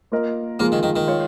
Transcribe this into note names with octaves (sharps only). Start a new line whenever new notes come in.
A#3 F4 A#4 D#5
F3 G#3 A#3 F4 A#4
D#3
D#3
D#3
G#3 F4 C#5